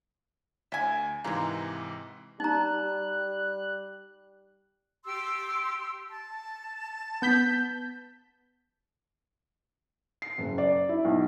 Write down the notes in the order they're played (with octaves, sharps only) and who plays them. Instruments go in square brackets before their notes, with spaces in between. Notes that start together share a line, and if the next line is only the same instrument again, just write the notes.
[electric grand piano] D2 [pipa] E5 G#5
[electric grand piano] G#2 C3 E3 [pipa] G#3 A#3
[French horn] G3 [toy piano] D#4 A#5 [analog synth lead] F#6
[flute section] G4 C6 E6
A5
[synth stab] B3 G6 B6
[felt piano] C7
F#1
D5
E4
B1